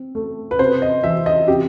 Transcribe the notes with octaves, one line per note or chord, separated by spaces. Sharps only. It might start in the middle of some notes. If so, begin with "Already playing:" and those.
Already playing: C4
A3
B4
C3 C5
D#5
E3 E5
D#5
C3 G4